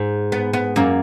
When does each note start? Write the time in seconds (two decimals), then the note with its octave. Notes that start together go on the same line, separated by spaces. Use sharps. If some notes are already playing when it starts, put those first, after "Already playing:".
Already playing: G#2
0.32 B3
0.54 B3
0.76 F#2 A#3